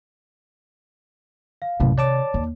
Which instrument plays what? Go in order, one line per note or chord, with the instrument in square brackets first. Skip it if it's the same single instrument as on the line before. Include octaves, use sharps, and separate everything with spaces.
[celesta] F5
[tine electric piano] B1 F#2 A2 [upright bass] C3 D#3
[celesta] C#5 [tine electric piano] D5 A5 D6
[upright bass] D#2